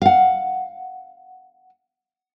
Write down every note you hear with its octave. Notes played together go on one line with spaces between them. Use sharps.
F5 F#5